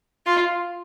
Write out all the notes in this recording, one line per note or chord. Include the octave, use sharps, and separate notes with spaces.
F4